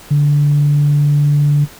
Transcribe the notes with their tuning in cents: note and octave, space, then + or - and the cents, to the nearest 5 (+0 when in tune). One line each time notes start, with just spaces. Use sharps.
D3 -15